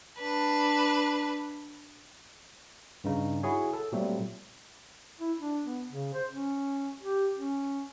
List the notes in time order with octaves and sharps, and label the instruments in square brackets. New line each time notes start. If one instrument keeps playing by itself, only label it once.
[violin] D4 B4
[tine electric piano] G2 C#3 D#4
E4 F#4 G#4 C#5
A4
A#2 F#3 G3 A3 C4
[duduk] E4
D4
B3
C#3
C5
C#4
G4
C#4